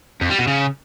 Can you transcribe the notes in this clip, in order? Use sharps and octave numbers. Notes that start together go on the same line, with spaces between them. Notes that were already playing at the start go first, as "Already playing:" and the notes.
F2
G3
B2
C#3